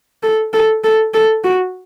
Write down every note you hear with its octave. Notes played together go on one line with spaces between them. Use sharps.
A4
A4
A4
A4
F#4